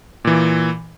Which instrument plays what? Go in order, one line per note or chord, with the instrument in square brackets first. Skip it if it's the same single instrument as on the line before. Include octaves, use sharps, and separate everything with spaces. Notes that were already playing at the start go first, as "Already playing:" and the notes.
[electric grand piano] A#2 E3